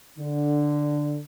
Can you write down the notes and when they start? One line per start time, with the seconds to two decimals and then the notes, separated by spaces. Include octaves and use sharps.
0.18 D3